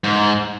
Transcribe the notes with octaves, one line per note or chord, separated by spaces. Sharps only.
G#2